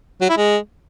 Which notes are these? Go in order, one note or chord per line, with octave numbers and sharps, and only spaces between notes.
F#3
E4
G#3